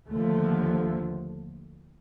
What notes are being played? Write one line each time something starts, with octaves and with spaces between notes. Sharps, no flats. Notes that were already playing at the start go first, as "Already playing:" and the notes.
D#2 D3 F3 A3